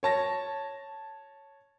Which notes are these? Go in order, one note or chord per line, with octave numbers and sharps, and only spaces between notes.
C#5 A5 A#6